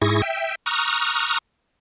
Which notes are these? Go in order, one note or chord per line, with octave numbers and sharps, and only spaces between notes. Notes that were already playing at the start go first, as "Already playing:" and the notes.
G#2 E4 G#4 C#6 A#6
E5 G5
A#5 C#6 D#6 F6 F#6